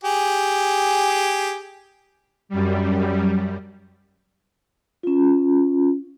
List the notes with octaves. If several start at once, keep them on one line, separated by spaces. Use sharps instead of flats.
G4 G#4
F#2 G3
C#4 F4